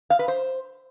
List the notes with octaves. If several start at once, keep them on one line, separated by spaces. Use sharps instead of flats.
F5
B4
C5